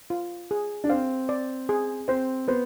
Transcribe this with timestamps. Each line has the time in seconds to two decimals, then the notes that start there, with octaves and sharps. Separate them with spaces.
0.10 F4
0.51 G#4
0.84 D4
0.90 C4 F5
1.29 D5
1.69 G#4
2.08 C4 C5
2.48 B3 C5